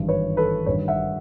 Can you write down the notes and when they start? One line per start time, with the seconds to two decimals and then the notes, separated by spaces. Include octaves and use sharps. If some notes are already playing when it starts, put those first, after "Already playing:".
Already playing: G#1 G2 E3
0.08 B4 C#5
0.37 A4 B4
0.66 A1 G2 D#3 B4 C#5
0.88 E5 F#5